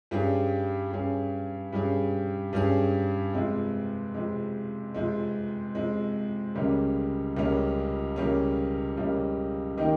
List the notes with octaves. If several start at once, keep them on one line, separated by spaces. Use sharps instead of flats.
G2 G3 C#4 G#4
G2 G3 C#4 G#4
G2 G3 C#4 G#4
G2 G3 C#4 G#4
F2 C3 F3 G#3
F2 C3 F3 G#3
F2 C3 F3 G#3
F2 C3 F3 G#3
C#2 C#3 G3 A#3 C#4
C#2 C#3 G3 A#3 C#4
C#2 C#3 G3 A#3 C#4
C#2 C#3 G3 A#3 C#4
D#3 A#3 D#4 G4